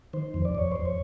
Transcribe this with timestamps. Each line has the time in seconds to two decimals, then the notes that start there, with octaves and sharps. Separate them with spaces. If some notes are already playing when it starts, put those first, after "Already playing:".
0.13 D#3 C5
0.34 F2
0.45 D5
0.55 F2 C#5
0.72 F2 C5
0.86 C#5